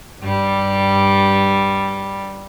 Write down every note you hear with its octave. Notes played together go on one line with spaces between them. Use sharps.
G2 G3